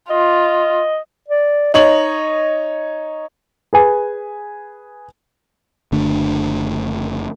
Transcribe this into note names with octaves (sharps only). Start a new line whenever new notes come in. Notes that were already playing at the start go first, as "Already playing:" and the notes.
F4 D#5
D5
D#4 C#5 D#5 F#7
G#4 B4 G#5
F#1 D3 A3 D4